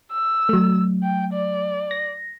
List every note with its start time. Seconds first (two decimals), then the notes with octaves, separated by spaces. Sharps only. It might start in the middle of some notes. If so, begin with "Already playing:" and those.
0.12 E6
0.49 F#3 A3
1.03 G5
1.33 D5
1.91 A#6